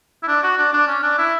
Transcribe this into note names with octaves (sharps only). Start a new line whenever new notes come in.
E4
D4
F#4
D4
D4
C#4
D4
E4